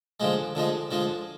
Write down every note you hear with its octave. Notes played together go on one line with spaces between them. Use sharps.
D3 F3 G#3
D3 F3 G#3
D3 F3 G#3